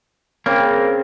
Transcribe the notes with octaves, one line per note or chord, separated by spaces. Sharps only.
C#3 A#3 C4